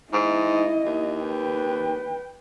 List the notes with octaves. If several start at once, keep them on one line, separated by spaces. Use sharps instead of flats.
G#2 E4 D#5
D#2
B4 G5